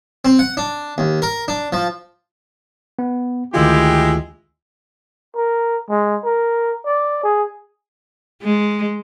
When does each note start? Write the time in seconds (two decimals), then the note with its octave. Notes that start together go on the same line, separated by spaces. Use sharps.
0.25 C4
0.39 F#5
0.57 D4
0.98 D#2
1.22 A#4
1.48 D4
1.73 F3
2.99 B3
3.54 D2 D#3 G#3 E4 F4 G4
5.36 A#4
5.90 G#3
6.25 A#4
6.85 D5
7.24 G#4
8.42 G#3